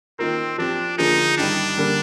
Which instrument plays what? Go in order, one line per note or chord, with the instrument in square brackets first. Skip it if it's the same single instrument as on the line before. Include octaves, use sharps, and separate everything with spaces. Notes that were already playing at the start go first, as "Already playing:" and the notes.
[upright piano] D#3 A#3 F4 A#4 [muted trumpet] C4
[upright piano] F3 C4 G4 [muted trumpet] D4
[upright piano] D3 F3 A#3 F4 G#4 [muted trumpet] D#4
[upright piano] G2 D#3 G3 [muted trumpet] D4
[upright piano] D3 G3 A#3